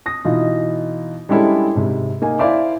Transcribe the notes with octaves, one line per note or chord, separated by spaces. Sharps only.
D#6 A#6
B2 E3 D#4 F4
G3 G#3 C#4 D4 E4 A4
G#2 C3
A#3 D#4 G#5
E4 C5 D5 E5 F5 D6